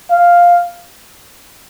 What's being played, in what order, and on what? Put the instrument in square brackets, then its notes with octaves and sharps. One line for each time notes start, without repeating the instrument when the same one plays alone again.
[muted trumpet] F5